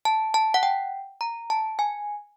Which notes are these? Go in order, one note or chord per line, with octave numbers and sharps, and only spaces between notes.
A5
A5
F#5
G5
A#5
A5
G#5